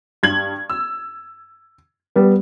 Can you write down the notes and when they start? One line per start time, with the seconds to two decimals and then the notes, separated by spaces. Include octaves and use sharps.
0.23 G2 G#6 F#7
0.70 E6
2.16 G3 B3